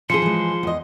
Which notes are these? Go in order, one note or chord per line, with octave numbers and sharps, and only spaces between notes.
E3 F3 C#4 G#4 C6 C#7
E3 G#3
E2 D#5